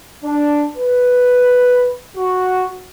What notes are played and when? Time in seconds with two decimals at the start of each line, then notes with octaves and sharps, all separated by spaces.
0.24 D4
0.76 B4
2.17 F#4